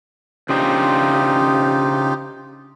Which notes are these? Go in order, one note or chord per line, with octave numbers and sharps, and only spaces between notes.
C#3 D4 D#4 F4 G4 C5